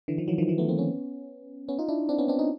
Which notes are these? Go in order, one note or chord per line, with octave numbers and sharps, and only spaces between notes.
D3 E3
D#3 F3
E3 F#3
D#3 F3
E3 F#3
A3 B3
A#3 C4
B3 C#4
B3 C#4
D#4 F4
D4 E4
C4 D4
B3 C#4
C4 D4
C#4 D#4